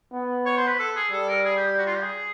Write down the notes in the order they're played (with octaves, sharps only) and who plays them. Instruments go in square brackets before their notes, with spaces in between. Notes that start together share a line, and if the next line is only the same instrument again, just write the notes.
[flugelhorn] B3
[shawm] C#5
C5
B4
A4
G#4
[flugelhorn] G3 [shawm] A4
[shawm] A#4
G#4
G4
G4
F#4
F4
G4
G#4